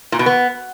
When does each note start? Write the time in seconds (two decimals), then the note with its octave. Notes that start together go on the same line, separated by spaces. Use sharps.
0.12 A#2
0.19 B2
0.26 B3